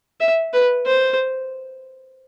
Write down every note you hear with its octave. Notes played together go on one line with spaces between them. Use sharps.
E5
B4
C5